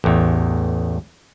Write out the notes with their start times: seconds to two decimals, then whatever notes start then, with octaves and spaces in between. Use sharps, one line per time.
0.04 A1 E2